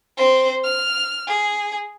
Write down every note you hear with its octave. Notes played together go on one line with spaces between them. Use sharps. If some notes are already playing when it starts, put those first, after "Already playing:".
C4 C5
F6
G#4